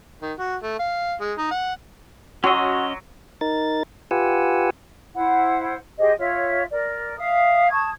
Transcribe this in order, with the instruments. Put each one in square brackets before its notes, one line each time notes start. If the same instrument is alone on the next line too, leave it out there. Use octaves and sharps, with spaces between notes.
[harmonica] D#3
F#4
A3
F5
G#3
D#4
F#5
[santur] F#3 [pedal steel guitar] C#4 D#5 [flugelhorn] F#4 [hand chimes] C6 E6
[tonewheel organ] D#4 A#4 A6
F4 G4 B4 F#5 G#5 E6
[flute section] E4 C5 F#5
G4 G#4 C5 D#5
F4 C#5 E5
A#4 D5
E5 F5 D#6
A5 C#6 D#6 G#6